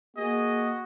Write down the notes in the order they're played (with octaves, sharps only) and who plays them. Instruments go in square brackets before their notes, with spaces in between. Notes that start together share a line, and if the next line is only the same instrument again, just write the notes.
[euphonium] A#3 [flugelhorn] F#4 [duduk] G#4 [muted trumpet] D#5